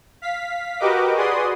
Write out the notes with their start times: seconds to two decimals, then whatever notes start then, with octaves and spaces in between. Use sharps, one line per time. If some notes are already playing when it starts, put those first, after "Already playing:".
0.22 F5 B6
0.79 F#4 G4 A#4 B4 D#5 D6
1.15 F#4 G#4 B4 D5 C6 D#6